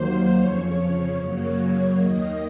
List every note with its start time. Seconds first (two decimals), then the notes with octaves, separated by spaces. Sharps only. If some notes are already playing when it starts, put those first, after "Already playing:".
Already playing: D#2 D#3 F#3 A#3 C5
0.37 F2 C#3 F3 C#5
1.18 F#2 C#3 F#3 A#3 C#5
1.59 C#5
1.99 D#2 D#3 A#3 D#5